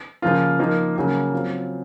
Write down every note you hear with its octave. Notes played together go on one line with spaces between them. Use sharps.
C#3 F3 A#3 F4
F3 A#3 D#4 A#4
C#3 F#3 A#3
F#3 C4 F4